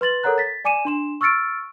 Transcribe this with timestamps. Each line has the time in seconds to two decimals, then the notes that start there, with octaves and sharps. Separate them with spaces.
0.01 B4 C6 A6 F#7
0.23 A4 A#4 C#5 F#5 A#5 F#6
0.38 A6 B6
0.64 D5 G#5 D6 C#7 D#7 E7
0.85 D4 C6 E7
1.21 C#6 E6 F6 A6 C#7 D7